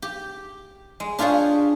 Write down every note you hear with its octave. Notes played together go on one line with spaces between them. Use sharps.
G4
G#3
D4 F4 G4 G#4 C#5